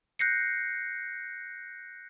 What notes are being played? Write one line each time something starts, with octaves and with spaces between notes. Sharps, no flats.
F#6 G6 A#6 C7 C#7